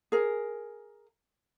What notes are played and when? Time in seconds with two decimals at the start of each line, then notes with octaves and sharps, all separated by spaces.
0.12 G#4 A#4